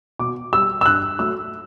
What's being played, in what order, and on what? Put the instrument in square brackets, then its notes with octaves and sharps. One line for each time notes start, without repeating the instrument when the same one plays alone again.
[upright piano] B2 D6
G3 E6
E6
G2 F#6
F#3 A3 E6